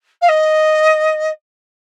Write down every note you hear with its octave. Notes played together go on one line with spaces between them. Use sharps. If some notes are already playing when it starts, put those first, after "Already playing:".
F5
D#5